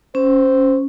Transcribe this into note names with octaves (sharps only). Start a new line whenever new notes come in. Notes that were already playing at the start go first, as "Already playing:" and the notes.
C#4 C5